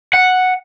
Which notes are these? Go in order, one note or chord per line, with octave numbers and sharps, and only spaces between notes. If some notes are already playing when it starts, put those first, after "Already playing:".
F#5